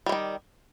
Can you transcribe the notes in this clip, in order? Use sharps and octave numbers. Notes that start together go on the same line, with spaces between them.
D#3 G3 G#3